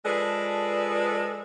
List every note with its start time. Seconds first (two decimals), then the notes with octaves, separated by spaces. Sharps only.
0.05 F3 G#3 G#4 A4 B4 D5